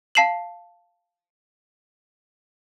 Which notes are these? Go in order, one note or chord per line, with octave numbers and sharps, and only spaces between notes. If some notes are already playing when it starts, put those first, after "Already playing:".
F5 A5 C7 E7 F#7